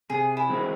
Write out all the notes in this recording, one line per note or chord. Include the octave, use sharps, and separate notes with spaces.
C3 G#4
E4
E3 G#3 C4